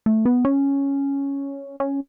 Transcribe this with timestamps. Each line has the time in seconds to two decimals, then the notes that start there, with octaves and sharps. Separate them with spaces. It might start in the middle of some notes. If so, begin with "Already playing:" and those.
0.06 A3
0.26 B3
0.45 C#4
1.80 C#4